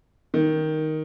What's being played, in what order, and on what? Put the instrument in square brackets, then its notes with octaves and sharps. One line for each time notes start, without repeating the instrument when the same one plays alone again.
[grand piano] D#3